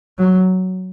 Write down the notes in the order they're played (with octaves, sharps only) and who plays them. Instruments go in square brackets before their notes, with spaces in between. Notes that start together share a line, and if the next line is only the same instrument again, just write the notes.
[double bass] F#3